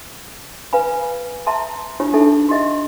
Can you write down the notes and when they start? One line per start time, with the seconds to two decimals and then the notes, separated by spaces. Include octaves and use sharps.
0.73 B4 F5 G#5 B5
1.46 E5 A5 A#5 C6
2.00 D4 F4 G4 C#5
2.13 D4 D#4 A4 E5
2.49 F#4 G4 D#5 E5